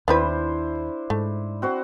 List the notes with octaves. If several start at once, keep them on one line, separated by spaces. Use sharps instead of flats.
D#2 B3 C4 D4 E4 B4 C5
G#2 A3
C4 F#4 C5